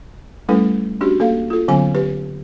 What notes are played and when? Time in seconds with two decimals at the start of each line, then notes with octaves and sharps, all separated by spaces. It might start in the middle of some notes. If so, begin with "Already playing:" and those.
0.49 G3 A3 C#4 E4 A4 B4
1.01 C#4 D4 F#4 G4
1.20 A#3 A4 F5
1.50 F4 A4
1.68 D3 F#3 B3 C#4 G#5
1.95 G4 B4